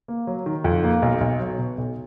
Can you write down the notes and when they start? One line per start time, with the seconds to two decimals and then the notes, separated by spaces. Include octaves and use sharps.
0.08 A#3
0.27 F#3
0.46 D#3
0.64 F2
0.83 A#3
1.02 B1
1.21 B1
1.40 F#3
1.58 B2
1.78 B1